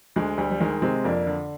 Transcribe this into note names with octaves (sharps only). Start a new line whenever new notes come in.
D2 G#3
D2 G3
G3
D#3 G#3
C3 G#3 C4
F2 A#3 D4
D3